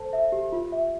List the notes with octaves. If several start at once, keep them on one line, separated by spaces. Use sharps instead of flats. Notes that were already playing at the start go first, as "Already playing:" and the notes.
Already playing: A4 C5 A5
E5
G4
F4
E5